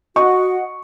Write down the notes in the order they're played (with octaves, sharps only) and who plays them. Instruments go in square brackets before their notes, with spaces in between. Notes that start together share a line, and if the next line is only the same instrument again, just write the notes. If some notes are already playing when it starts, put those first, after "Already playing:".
[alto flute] F#4 [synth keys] D#5 F#5 [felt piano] C#6